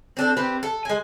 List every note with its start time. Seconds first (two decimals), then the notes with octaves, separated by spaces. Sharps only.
0.17 C4 D4 A4
0.37 C4 G4 B4
0.63 A4
0.85 G#3 G#5